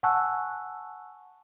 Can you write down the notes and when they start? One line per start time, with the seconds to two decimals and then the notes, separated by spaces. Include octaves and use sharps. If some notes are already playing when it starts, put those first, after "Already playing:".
0.03 F#5 G#5 A5 C#6 E6 F#6